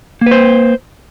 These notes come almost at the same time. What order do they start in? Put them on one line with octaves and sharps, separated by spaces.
A#3 B4 C5